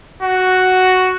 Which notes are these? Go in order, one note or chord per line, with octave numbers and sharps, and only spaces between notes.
F#4